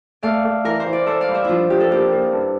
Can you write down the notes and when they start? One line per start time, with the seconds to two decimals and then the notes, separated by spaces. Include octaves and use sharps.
0.23 A3 D5 F5
0.45 A3
0.65 E3 A#4
0.80 C5
0.86 E3
0.93 D5
1.06 A4 C5 E5
1.21 D5 F5
1.28 G3
1.35 C5 E5
1.44 F3 D4 E4 F4
1.70 F3 G4
1.80 A4
1.91 A#3 E4 G4
2.12 A#3
2.33 G2